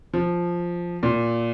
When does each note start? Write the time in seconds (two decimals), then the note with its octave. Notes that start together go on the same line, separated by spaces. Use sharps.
0.14 F3
1.03 A#2